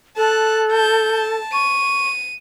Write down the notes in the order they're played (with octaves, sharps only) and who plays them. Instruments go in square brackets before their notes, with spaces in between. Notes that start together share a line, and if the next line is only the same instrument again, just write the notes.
[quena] A4 [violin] A5 F#6
[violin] A5 G6
A5
[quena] C#6 [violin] D#7